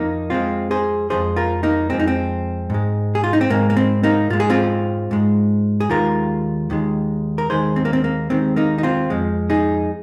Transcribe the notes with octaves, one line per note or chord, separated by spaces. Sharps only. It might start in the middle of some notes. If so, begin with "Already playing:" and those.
Already playing: F2 F3 A#3 D#4
F2 F3 G#3 C4 F4
G#4 C5
F2 F3 G#3 G#4 C5
F4 A#4
A#3 D#4
F2 F3 G#3 C4
D#4
C4
G#2 G#3
G#4
F4
D#4
C4
G#2 G#3 A#3
A#3
C4
A#3 D#4
G#2 G#3 F4
G#4
C4 F4
G#2 G#3
G#4
D#2 D#3 G#3 F4 A#4
D#2 D#3 G#3
A#4
D#2 D#3 G#3 G#4 C5
C4
A#3
C4
A#3
D#2 D#3 G#3 C4
A#3 D#4
D#4
C4 F4
F2 F3 G#3
D#4 G#4